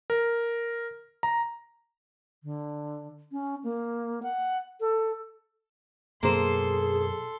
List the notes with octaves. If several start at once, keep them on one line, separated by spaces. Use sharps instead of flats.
A#4
A#5
D3
C#4
A#3
F#5
A4
F#2 B2 F#3 A#3 G#4 A4 C5 C6